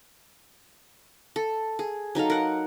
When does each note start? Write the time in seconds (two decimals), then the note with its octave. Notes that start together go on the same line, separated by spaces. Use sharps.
1.36 A4
1.79 G#4
2.15 F#3 D#4 A4 F5
2.30 A#4 F#5